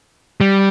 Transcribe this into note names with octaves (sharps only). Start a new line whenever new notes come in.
G3